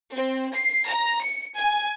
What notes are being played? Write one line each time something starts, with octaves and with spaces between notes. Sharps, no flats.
C4
C7
A#5
C#7
G#5